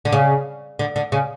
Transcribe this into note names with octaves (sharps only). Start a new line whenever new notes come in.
D3
C#3
D3
D3
C#3